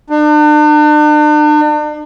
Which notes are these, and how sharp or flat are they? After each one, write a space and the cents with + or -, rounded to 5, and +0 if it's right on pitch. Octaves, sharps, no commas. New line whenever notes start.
D4 +40